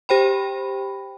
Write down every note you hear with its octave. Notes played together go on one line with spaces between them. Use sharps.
G4 C5 G5 B5